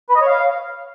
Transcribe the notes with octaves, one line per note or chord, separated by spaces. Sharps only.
B4
D#5
C#5
F5